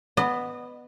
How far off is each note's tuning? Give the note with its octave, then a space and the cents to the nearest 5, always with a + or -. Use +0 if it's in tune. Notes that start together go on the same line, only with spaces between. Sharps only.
B3 +0 D#5 -35